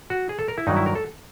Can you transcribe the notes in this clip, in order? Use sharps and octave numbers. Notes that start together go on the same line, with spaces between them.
F#4
G#4
A4
A#4
E4
G2 D#3 F#3 D#4
E4
A#4
A4